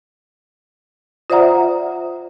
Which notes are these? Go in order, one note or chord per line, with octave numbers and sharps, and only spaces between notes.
F4 C5 D5 E5 F#5 A#5